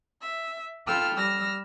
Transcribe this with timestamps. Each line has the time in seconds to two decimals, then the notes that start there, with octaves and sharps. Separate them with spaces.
0.22 E5
0.87 F4 A4 G5 B5 E6 F6
1.17 G3 E6 F6 A#6